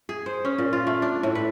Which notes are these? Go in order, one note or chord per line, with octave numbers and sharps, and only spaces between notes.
G#4
C5
C#4
A#2
F4
A3
D4
A2
B4